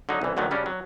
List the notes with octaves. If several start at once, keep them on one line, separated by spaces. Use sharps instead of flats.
D3 F#3 D#4
C2 E3
D2 D3 D#3 F#3 A3
C#3 G3 C#4 D4
F#3